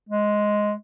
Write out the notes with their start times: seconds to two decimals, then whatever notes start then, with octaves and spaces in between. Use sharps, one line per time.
0.09 G#3